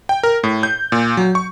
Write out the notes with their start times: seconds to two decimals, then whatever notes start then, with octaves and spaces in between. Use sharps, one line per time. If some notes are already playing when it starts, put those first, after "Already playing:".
0.09 G5
0.23 A#4
0.44 A2
0.63 G6
0.92 A#2
1.17 F#3
1.35 C#6